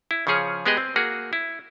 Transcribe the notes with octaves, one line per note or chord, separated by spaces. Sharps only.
E4
C#3 F3 C#4 G#4 C#5
G#3 B3 G4 G#4 D#5
C4
A#3 F#4 G#4
E4